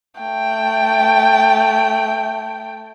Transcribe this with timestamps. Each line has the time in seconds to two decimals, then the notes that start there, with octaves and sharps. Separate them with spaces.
0.21 A3 G5